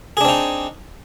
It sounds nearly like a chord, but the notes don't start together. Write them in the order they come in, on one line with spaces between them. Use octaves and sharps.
G#4 D4 C4 D#4